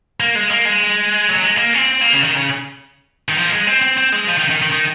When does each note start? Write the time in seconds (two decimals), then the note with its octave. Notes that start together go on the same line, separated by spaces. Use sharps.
0.20 A#3
0.35 G#3
0.51 A#3
0.65 G#3
1.29 F#3
1.42 G#3
1.56 A#3
1.74 C#4
1.78 C4
2.01 A#3
2.13 C#3
2.24 D#3
2.35 C#3
3.29 D#3
3.37 F3
3.46 A#3
3.52 G#3
3.67 C4
3.82 C4
3.97 C4
4.12 G#3
4.27 F3
4.38 D#3
4.50 D#3
4.62 D#3
4.72 D#3